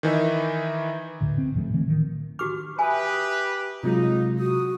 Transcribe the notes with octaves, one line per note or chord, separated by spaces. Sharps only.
D#3 E3 D#4 E5
D2 A2 D3
C4
A2 F3 G#3 A3
D3 E3 A3 C4
D#3
F#4 G4 D6 F6
G4 B4 E5 G#5 D#6
C3 F#3 G#3 D#4 F4
F#4 D#6